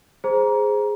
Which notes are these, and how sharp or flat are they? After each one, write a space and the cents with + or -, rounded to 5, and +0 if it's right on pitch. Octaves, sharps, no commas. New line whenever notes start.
G#4 +0 C5 +0 A#5 +20